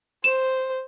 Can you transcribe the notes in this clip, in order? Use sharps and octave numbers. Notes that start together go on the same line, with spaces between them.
C5 E7